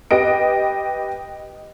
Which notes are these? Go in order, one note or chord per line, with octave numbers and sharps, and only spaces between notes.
G4 B4 D#5 D7